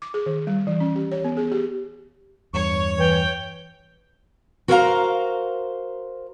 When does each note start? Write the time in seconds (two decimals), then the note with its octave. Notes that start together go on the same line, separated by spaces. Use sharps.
0.02 D6
0.14 G#4
0.26 D#3
0.47 G3
0.67 E3
0.80 C#4
0.96 G4
1.12 C#5
1.24 B3
1.37 G#4
1.52 G4
2.53 E2 G2 C#5 C#6
2.99 E3 G5
4.68 F#4 A#4 C5 C#5 F5 A#5